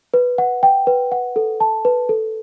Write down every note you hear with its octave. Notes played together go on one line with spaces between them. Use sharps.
B4
F#5
G5
B4
F#5
A4
A5
B4
A4